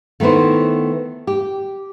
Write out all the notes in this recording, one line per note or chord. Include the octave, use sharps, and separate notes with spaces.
D#3 A3 B3 E4 C5
G4